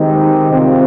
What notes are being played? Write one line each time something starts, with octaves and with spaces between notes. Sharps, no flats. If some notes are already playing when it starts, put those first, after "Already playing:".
Already playing: D#3 G#3 C4 D#4 G4
C3 D#3 G3 C4 F4